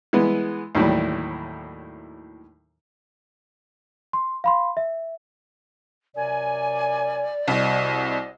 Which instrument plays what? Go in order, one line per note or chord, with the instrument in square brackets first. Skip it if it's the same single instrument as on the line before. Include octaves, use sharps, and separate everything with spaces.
[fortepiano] E3 G#3 B3
D#2 A2 E3 F#3 G3
[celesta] C6
F5 B5 C6
E5
[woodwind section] F#2 C3 G#5 [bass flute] D5
[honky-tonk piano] C2 [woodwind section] C4 F#4 D#5